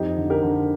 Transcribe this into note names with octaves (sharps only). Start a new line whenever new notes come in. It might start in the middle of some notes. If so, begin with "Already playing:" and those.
Already playing: F2 D#4 G4
D3
G4 A#4
D3